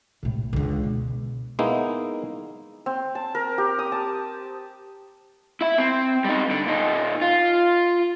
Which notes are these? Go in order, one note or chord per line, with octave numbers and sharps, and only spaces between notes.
C2 A2
C#2 D3
B2
G#3 A#3 B3 D#4 E4
C4
A5
A#4
G4
D#6
A5
E4 E5
C4
G3 D#4
D3
A#2 D#4
F4